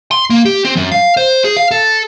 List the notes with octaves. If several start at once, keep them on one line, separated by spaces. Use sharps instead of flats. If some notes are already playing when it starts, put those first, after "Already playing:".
C6
A#3
G4
C4
F#2
F5
C5
G#4
F5
A4